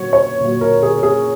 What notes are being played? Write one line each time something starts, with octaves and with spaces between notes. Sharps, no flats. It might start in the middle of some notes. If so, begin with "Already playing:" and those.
Already playing: A#2 F#3 C#5
C#5
A#2 F#3
A#4
G#4
G#4